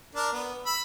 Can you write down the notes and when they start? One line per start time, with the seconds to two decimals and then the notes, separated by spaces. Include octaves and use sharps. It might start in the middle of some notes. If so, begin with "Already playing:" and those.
0.15 D4 A#4
0.32 B3
0.66 B5 E6